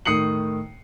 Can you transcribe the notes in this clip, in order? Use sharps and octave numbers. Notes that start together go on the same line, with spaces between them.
A2 D#3 D#6 C7 C#7 F#7